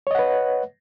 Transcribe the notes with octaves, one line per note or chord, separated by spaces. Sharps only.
B4 C#5 D#5 F#5